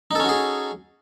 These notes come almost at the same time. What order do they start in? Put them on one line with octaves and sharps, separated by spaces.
D#4 A4 C#4 F#4 G#4